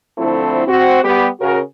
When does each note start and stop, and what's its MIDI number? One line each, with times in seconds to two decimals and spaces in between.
0.18 0.64 50
0.18 0.64 53
0.18 0.64 57
0.18 0.64 60
0.18 0.64 64
0.67 1.02 60
0.67 1.02 66
1.03 1.27 55
1.03 1.27 59
1.03 1.27 67
1.40 1.59 49
1.40 1.59 66
1.40 1.59 70